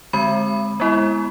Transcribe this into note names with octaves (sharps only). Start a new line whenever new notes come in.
D3 G#3 C4 B5
G#3 B3 E4